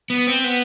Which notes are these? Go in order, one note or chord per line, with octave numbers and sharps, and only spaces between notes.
B3
C4
B3